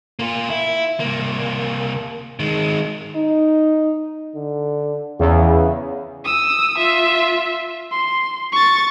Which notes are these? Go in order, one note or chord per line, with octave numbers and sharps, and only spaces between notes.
A#3 F4
E4
C2 A#3
D#3 G#3
D#4
D3
E2 C#3
D#6 E6
F4 E5
C6
C#6 A6